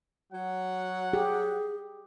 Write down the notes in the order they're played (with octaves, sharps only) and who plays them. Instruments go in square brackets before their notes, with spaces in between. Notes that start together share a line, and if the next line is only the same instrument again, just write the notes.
[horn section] F#3 F#5
[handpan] G4 [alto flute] G#4